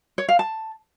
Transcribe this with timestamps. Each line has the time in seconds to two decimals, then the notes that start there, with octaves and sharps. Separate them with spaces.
0.18 C#5
0.29 F5
0.39 A5